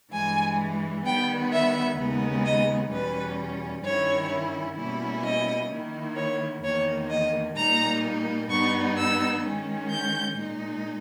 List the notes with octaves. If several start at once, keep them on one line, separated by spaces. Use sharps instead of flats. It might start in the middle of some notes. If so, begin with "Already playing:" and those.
G2 E3 G#3 G#5
D#3 G3 B3 G5
E5
D#2 C#3 G#3 B3 D#4
D#5
E2 B2 G3 C#4 B4
G2 D#3 G3 C#4 E4 C#5
B2 G3 A#3 C#4 E4
D#5
D#3 A#3 E4
C#5
E2 D#3 A#3 C#5
D#5
A#2 G3 A#3 D#4 A#5
G2 G3 B3 D#4 C#6
E6
D#3 G#3 C#4
G6
A#2 G#3 D#4